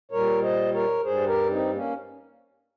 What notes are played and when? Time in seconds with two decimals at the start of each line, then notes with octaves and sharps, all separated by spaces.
0.11 A#2 G3 A#4 C#5
0.42 C5 D#5
0.73 A#4 C#5
1.04 G2 G3 G#4 C5
1.27 G4 A#4
1.50 C4 D#4
1.73 A#3 C#4